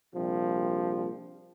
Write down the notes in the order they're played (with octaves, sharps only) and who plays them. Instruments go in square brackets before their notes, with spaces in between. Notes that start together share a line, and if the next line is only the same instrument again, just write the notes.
[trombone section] A#1 C3 F3 G3